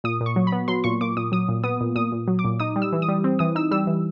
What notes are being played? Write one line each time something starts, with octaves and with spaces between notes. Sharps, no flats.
A#2 D#6
A#2
C#6
F#3
B5
B3
F#3 C6
A#2 C#6
A#2 D6
A#2 D#6
F#3 D#6
A#2
B3 D#6
A#2
A#2 D#6
A#2
F#3
D6
A#2
D#4 D#6
G3
E6
E3
D#6
G3
C4
E3 D#6
D#4 E6
G3 E6
E3